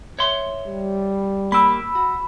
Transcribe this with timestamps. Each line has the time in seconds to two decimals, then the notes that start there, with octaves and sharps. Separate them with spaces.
0.19 C#5 E5 C6
0.68 G3
1.52 A#3 G4 B5 E6
1.95 F#4